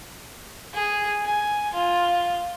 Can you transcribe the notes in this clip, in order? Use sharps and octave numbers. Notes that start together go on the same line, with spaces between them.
G#4
G#5
F4